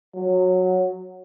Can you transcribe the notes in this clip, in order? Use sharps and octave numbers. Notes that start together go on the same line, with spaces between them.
F#3